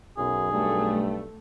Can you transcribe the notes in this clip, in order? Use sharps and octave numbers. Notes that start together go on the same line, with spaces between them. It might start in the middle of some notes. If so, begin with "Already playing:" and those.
B1 F#2 G#4
G2 A3